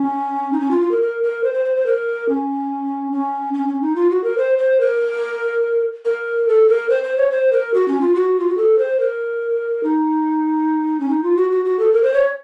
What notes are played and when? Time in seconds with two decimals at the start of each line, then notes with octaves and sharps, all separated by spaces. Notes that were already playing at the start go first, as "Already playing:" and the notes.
Already playing: C#4
0.53 D#4
0.61 C#4
0.71 F4
0.81 F4
0.91 A#4
1.02 A#4
1.23 A#4
1.44 C5
1.54 C5
1.65 C5
1.76 C5
1.86 A#4
2.29 C#4
3.12 C#4
3.54 C#4
3.68 C#4
3.82 D#4
3.96 F4
4.11 F#4
4.24 A#4
4.38 C5
4.58 C5
4.80 A#4
6.05 A#4
6.48 A4
6.69 A#4
6.90 C5
7.03 C5
7.18 C#5
7.31 C5
7.52 A#4
7.74 F#4
7.88 C#4
8.01 F4
8.16 F#4
8.40 F4
8.49 F#4
8.57 A4
8.79 C5
9.00 A#4
9.83 D#4
11.00 C#4
11.10 D#4
11.24 F4
11.37 F#4
11.52 F#4
11.65 F#4
11.79 A4
11.93 A#4
12.03 C5
12.14 C#5